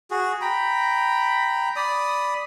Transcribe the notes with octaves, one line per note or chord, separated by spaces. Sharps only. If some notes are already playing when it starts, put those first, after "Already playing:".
F#4 G#4
G5 A#5 B5
D5 B5 D#6